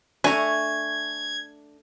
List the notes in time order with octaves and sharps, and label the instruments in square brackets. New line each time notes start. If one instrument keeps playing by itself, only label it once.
[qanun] A3 A#5 [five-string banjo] D4 [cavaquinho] G#5 C#6 [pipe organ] G#6